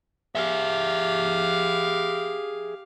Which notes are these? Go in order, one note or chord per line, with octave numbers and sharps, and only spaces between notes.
G4 G#4 E5 F5